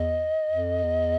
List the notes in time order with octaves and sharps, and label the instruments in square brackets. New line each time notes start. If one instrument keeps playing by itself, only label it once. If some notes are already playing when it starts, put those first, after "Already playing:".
Already playing: [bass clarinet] E2 [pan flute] D#5
[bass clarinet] F2
E2